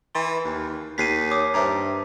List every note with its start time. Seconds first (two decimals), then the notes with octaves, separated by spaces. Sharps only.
0.15 E3 C6
0.44 D#2
0.98 D#2 B6 C7 D#7
1.31 C#5 D6 D#6
1.54 G2 C5 E5 A#5